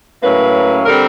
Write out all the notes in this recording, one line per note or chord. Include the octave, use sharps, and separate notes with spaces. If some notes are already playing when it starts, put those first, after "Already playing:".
A2 F#3 A#3 C#4 B4
D3 G3 C4 A#4